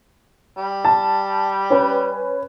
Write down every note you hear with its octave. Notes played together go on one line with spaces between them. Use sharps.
G3
A5
C#4 B4